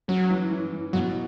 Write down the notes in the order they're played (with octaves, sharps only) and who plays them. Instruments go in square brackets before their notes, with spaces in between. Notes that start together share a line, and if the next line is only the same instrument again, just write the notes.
[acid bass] F#3 [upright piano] C#4
[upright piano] E3
E3
E3
[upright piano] B2 [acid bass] F#3